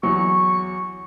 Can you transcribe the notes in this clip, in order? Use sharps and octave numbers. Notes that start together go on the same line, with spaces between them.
E2 F#3 C#6